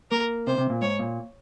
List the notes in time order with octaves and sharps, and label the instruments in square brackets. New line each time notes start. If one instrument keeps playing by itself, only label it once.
[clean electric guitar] A#3 [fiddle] A#4
[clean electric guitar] C3 [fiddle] C5
[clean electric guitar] C3
A#2
[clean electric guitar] G#2 [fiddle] C#5
[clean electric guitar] A#2